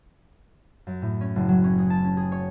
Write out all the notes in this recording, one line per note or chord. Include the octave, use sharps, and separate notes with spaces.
F#2
A2
C#4
F#1
F#3
C#4
G#4
A5
C#4
G#4
C#5